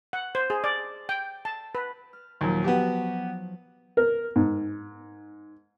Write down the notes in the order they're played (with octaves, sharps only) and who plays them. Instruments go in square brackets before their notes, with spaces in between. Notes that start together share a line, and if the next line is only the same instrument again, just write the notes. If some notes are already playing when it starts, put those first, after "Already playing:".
[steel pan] F#5
C5
G#4
D5
G5
A5
B4
[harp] F6
[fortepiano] D#2 A#2 [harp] F3 F#3 D#4
[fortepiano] B3 F#4 G4 [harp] A5
[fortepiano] A#4
G#2